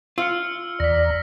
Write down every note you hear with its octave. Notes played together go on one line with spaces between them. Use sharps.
F4 E6 F6 C#7
E2 D5 A#5 A#6 B6